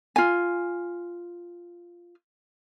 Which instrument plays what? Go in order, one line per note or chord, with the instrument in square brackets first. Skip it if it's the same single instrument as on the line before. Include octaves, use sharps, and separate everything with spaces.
[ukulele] F4 G#5